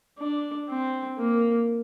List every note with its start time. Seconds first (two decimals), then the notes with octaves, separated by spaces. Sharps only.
0.19 D4
0.69 C4
1.18 A#3